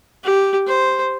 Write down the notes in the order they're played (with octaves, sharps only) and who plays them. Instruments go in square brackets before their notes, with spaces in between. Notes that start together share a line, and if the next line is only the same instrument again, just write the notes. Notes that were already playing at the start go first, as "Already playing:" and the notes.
[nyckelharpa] G4
C5